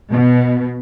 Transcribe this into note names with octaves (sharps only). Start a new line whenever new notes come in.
B2